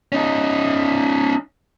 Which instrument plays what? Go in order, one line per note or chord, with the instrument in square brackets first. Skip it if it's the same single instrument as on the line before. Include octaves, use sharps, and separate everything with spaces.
[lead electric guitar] C#4 D#4